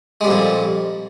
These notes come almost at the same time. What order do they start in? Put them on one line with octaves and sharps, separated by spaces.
G#3 G3 F2 A#2